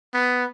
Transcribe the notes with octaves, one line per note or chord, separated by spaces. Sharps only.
B3